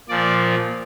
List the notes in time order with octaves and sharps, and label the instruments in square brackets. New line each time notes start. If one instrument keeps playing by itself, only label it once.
[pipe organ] A#2 F3 D5